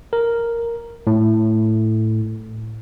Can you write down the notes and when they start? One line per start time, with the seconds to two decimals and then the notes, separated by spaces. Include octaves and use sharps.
0.13 A#4
1.07 A2